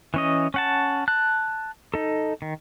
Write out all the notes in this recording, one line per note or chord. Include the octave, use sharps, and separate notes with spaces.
E3 C#4 D#5
C#4 F#5 A5
A5 F#6
D#4 A4
D#3